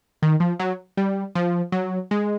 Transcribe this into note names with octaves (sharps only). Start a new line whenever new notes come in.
D#3
F3
F#3
G3
F3
F#3
G#3